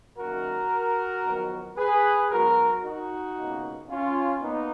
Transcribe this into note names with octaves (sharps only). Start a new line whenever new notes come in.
F#2 D#3 A#3 F#4 A#4
F2 D#3 F#3 B3
G#4 B4
G#2 F#3 B3 F#4 A#4
D#4 F#4
C#2 B2 A#3
C#4 F4
A#3 B3 D#4